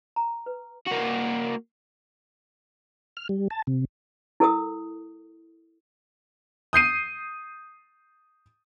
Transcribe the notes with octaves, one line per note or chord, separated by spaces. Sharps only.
A#5
B4
A#3 F#4
F6
G3
A5
C3
E4 A4 A#4 D#6
D#6 G6 C7 D#7